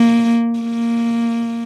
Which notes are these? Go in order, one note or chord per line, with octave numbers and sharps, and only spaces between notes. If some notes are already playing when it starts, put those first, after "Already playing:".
Already playing: A#3
A#3